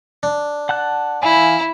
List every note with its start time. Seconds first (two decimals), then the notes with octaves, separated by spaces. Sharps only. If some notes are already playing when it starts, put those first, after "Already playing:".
0.23 D4
0.69 F#5 A5 F#6
1.23 E3 E4 F5 G#5